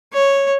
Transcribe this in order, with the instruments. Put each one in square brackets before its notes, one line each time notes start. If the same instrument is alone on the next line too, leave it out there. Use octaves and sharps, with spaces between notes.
[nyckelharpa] C#5